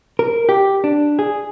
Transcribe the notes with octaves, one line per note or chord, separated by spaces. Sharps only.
A#4
G4
D4
G#4